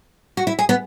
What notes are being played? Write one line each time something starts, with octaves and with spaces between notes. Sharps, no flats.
F#4
E4
G#4
B3